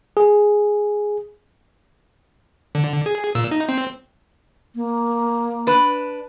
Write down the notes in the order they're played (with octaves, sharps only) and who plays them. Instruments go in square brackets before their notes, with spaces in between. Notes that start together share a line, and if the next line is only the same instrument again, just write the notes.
[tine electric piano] G#4
[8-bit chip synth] D3
G#4
A#2 E6
D#4
C4
[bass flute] A#3
[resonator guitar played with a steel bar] D4 B4